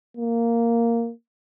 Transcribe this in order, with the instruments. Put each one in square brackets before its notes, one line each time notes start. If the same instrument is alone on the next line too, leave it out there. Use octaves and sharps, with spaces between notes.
[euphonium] A#3